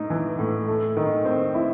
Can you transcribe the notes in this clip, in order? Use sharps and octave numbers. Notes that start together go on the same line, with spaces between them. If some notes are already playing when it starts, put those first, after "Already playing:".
Already playing: A2 D#4
E3
A2
A3
D#3
C4
E4